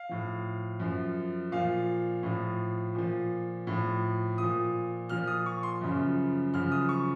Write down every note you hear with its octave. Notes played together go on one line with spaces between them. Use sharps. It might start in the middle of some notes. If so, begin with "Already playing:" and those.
Already playing: F5
A2 F3
F#2 F3
A#2 F3 F5
A2 F3
A#2 F3
A2 F3
A#2 F3 D#6
A#2 F3 F6
D#6
C#6
C6
F#2 C#3 F3
F#2 C#3 F3 F6
D#6
C#6